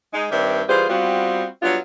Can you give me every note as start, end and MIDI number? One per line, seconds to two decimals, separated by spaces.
0.14 0.26 56
0.14 0.26 63
0.31 0.63 43
0.31 0.63 51
0.31 0.63 60
0.31 0.63 74
0.31 0.63 76
0.68 0.85 52
0.68 0.85 55
0.68 0.85 65
0.68 0.85 68
0.68 0.85 72
0.89 1.45 55
0.89 1.45 59
0.89 1.45 60
0.89 1.45 65
0.89 1.45 66
1.62 1.78 54
1.62 1.78 55
1.62 1.78 59
1.62 1.78 62
1.62 1.78 65